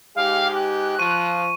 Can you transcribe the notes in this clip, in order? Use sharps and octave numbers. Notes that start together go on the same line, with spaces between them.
G#2 G#3 G4 F5
F#6
F3 C#6 D#7